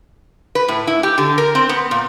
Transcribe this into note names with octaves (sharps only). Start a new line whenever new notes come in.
B4
A2
E4
G4
D3
A#4
C4
B3
A#2